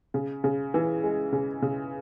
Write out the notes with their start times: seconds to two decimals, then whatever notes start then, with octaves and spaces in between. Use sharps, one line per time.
0.14 C#3
0.44 C#3
0.74 E3
1.04 G#3
1.33 C#3
1.62 C#3